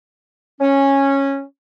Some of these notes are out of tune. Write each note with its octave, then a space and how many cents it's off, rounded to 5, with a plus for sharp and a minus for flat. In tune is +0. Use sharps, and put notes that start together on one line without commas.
C#4 -10